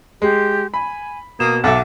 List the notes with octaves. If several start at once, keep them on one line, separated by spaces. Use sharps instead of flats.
G#3 G4
G#5 B5
B2 A#3 D#6 E7
B1 A4 E5 F#5 D6